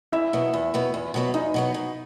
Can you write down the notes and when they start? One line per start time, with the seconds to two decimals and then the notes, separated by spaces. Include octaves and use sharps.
0.12 E2 E4 E5
0.33 B2 F#3 B3
0.54 E2
0.74 B2 F#3 B3
0.94 E2
1.14 B2 F#3 B3
1.34 E2 D#4 D#5
1.54 B2 F#3 B3
1.74 B2